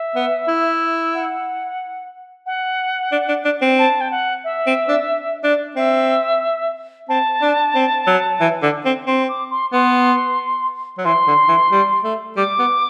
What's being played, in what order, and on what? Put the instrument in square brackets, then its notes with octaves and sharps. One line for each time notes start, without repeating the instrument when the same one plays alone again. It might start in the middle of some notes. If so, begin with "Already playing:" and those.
Already playing: [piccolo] E5
[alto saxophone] B3
E4
[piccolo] F#5
F#5
[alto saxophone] D4
D4
D4
C4
[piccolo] A5
G5
F#5
E5
[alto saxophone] C4
D4
D4
[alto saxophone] C4 [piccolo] E5
[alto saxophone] C4 [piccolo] A5
[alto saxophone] D4
C4
F#3
E3
D3
C4
[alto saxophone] C4 [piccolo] C6
[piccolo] D6
C6
[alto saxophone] B3 [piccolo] C6
[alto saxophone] F#3
[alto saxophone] E3 [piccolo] C6
[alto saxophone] D3
E3
G3
A3
[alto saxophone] G3 [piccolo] D6
[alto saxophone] B3